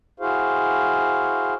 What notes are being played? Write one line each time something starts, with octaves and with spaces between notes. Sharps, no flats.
E4 F#4 G#4 C5 F5